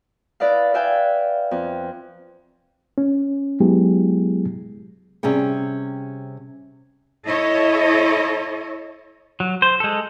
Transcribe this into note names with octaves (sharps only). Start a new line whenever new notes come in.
E4 B4 D5 D#5 F5
B4 D5 E5 F5 G5 G#5
F2
C#4
F#3 G#3 B3 E4 G4 G#4
C3 G3 C#4 G#4 G5
E4 A4 C#5 D#5
F#3
C5
G#3 A4